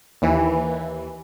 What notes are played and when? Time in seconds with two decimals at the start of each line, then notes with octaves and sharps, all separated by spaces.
0.22 D#2 E3